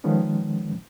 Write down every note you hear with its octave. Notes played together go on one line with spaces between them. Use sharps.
D#3 F3 G#3 B3 C#4